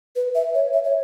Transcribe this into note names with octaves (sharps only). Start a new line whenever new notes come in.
B4
E5
C#5
E5
C#5